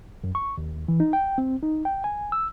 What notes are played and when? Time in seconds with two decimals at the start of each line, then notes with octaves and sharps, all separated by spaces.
0.24 F#2
0.35 C#6
0.58 D#2
0.88 E3
1.00 D#4
1.13 G5
1.38 C4
1.62 D#4
1.85 G5
2.04 G#5
2.32 E6